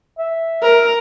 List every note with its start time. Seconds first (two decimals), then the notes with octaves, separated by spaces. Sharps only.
0.18 E5
0.62 A#4